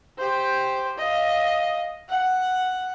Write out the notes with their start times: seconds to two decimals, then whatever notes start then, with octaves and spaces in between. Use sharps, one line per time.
0.18 G4 C5
0.98 D#5 F5
2.09 F#5